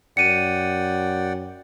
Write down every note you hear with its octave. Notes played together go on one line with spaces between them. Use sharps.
F#2 D5 F#5 G5 C#7 D#7